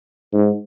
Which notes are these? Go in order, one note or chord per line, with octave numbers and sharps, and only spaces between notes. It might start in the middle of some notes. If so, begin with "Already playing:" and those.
G#2